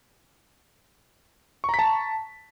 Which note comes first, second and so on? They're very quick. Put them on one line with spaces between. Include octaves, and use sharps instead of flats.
C#6 A#5 B6 A5